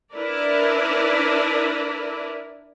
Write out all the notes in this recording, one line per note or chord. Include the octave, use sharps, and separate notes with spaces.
D4 E4 A#4 B4 D5